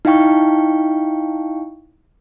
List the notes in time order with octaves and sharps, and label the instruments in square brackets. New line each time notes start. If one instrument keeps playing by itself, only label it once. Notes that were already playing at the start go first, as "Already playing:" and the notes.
[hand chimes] D#4 E4 F5 G5 C#6